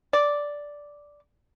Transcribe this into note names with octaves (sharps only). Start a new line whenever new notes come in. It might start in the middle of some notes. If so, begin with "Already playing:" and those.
D5